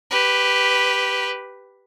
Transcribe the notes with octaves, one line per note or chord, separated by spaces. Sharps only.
G4 B4